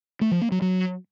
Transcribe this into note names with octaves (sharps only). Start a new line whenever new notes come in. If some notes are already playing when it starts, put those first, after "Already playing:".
A3
F3
A#3
F#3
F#3